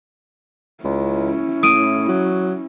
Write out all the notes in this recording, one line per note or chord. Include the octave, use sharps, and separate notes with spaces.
C#2 C#4 E4
A2 D#6 D7 D#7
F#3